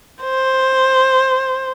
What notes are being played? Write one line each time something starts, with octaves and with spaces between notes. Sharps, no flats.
C5